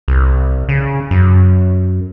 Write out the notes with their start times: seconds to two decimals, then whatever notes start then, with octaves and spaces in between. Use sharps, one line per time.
0.08 C2
0.69 C#3
1.11 F#2